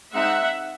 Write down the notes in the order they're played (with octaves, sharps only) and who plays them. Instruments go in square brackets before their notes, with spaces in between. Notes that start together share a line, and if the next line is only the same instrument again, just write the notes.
[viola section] G#3 C4 D#4 E5 F#5